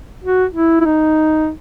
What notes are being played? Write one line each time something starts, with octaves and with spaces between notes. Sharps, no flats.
F#4
E4
E4
D#4